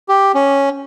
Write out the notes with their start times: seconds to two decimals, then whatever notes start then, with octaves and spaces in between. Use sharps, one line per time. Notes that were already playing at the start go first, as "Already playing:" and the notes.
0.09 G4
0.35 C#4